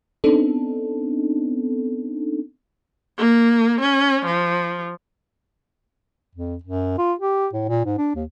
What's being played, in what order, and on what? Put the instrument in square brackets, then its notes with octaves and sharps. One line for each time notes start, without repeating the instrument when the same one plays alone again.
[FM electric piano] B3 C4 D4 D#4 A4
[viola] A#3
C#4
F3
[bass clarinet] F2
F#2
F4
G4
A2
A#2
G#2
D4
D#2